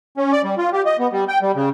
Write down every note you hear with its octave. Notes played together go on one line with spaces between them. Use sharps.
C#4
D5
G3
F4
G4
D#5
B3
G3
G5
G3
C#3